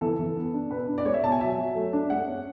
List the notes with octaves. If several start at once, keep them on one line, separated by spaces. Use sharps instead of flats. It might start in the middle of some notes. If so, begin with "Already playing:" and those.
E3 A4
E3
B3
D4
B2 B4
D4
D5
G#3 C#5
E5
B2 A5
G#5
F#3 E5
F#3
A3
D4
G#3 F#5
C#4